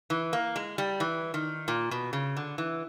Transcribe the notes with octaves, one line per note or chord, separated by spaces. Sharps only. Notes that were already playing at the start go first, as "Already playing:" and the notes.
E3
A#3
G#3
G3
E3
D#3
A#2
B2
C#3
D3
E3